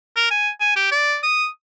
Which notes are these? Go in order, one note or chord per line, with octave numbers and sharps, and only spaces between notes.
A#4
G#5
G#5
G4
D5
D#6